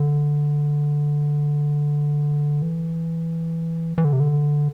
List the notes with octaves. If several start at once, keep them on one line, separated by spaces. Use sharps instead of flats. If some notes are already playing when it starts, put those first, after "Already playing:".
Already playing: D3
E3
E3
D3
C3
D3